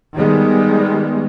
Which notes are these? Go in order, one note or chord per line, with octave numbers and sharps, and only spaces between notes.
D#3 G3 G#3 B3